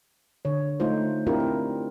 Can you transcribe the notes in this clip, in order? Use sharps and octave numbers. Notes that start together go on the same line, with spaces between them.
D3 C#5
A3 D#4 F4 C5
C4 D4 E4 F4 G4 A#4
E4